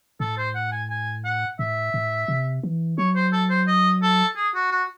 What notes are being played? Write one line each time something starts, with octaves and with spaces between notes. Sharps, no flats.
A2 A4
C5
F#5
G#5
G#5
F#5
A2 E5
A2
C3
E3
F#3 C#5
C5
A4
C5
D#5
A4
G#4
F#4
F#4